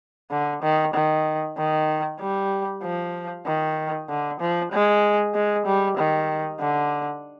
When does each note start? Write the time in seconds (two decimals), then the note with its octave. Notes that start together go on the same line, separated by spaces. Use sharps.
0.31 D3
0.62 D#3
0.94 D#3
1.58 D#3
2.20 G3
2.82 F3
3.46 D#3
4.09 D3
4.40 F3
4.72 G#3
5.34 G#3
5.66 G3
5.97 D#3
6.60 D3